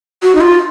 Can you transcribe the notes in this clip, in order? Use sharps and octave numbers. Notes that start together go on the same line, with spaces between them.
F#4
D#4
F4